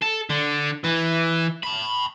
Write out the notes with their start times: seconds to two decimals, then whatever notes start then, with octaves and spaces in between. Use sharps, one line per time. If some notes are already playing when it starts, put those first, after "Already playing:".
0.02 A4
0.30 D3
0.84 E3
1.63 A5 B5